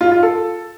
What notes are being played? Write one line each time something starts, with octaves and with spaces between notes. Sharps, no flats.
F4
F4
A4